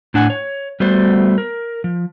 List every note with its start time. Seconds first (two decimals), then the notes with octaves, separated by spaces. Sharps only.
0.14 A2 D4 F#5 G#5
0.30 C#5
0.80 G3 A3 B3 F#4 C5 D5
1.38 A#4
1.84 F3